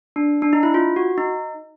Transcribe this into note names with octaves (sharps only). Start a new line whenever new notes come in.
D4
D4
D#4
E4
F4
F#4
D#4